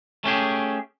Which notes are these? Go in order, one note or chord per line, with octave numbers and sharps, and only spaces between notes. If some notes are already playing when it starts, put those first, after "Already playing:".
A3 C#4 G4 G#4